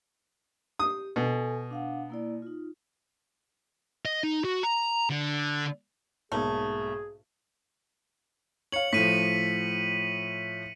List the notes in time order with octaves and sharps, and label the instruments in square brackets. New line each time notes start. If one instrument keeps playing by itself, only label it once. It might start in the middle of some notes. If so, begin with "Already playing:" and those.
[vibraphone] G4 [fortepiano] D#6
[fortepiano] B2 [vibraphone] A4 G#5
[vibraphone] D4 F5 F#5
A#3 E4 D5
D#4 F4
[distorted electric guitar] D#5
D#4
F#4
A#5
D3
[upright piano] B1 G#2 A#3 [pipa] A3 [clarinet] G#4
[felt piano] C#5 F5 [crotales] C#7 F#7
[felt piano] A2 F3 [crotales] B6 D#7